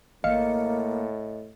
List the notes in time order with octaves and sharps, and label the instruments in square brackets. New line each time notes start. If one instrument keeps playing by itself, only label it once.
[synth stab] A1 F5 C#7 [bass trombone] A2 [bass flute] A#3 [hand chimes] D#5